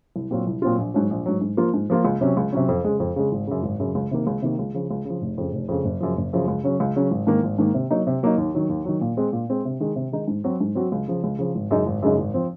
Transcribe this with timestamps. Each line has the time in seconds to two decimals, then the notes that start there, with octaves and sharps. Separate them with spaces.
0.16 C2
0.31 A#2 F#3 C4 F4
0.47 C2
0.62 A#2 F#3 C4 F4
0.78 A#1
0.94 G#2 F#3
1.11 A#1
1.26 G#2 F#3
1.41 G#2
1.57 F3 A#3 F4
1.74 G#2
1.90 F3 A#3 F4
2.05 C#2
2.21 C3 F#3 C#4
2.37 C#2
2.52 C3 F#3 C#4
2.68 F2
2.84 C#3 G#3
3.00 F2
3.16 C#3 G#3
3.32 G#1
3.47 F#2 C#3
3.63 G#1
3.80 F#2 C#3
3.95 C#2
4.11 C3 D#3 A#3
4.27 C#2
4.42 C3 D#3 A#3
4.59 C#2
4.74 C#3 F3
4.91 C#2
5.05 C#3 F3
5.22 F1
5.38 F2 C#3
5.53 F1
5.68 F2 C#3
5.85 F#1
6.00 F#2 C#3 F3
6.17 F#1
6.33 F#2 C#3 F3
6.48 C#2
6.64 C#3 F#3 C#4
6.80 C#2
6.96 C#3 F#3 C#4
7.11 G#1
7.27 G#2 D#3 A#3
7.43 G#1
7.58 G#2 D#3 A#3
7.74 C3
7.90 F#3 A#3 D#4
8.07 C3
8.23 F#3 A#3 D#4
8.38 D#2
8.55 D#3 F#3
8.69 D#2
8.85 D#3 F#3
9.01 A#2
9.17 G#3 C4
9.33 A#2
9.50 G#3 C4
9.65 C3
9.80 D#3 G#3 D#4
9.96 C3
10.12 D#3 G#3 D#4
10.28 G#2
10.44 F#3 C4 F#4
10.60 G#2
10.75 F#3 C4 F#4
10.92 C#2
11.08 C#3 F3
11.24 C#2
11.39 C#3 F3
11.55 G#1
11.71 F#2 C#3 G#3 D#4
11.86 G#1
12.02 F#2 C#3 G#3 D#4
12.19 G#1
12.34 F3 C4